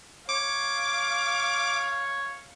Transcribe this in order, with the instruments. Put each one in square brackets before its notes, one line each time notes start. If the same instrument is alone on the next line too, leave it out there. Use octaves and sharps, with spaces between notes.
[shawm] C#5 [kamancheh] F5 [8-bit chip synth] D6